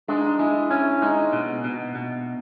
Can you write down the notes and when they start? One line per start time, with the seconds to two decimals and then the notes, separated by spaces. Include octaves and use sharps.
0.08 G#3 D4
0.18 D#4
0.26 D4
0.39 G#3 E4
0.71 C#4 E4
1.02 G#3 D#4
1.33 B2
1.64 B2
1.95 B2